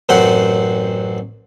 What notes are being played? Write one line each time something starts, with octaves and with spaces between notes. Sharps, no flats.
A1 F#2 C4 F#5 C6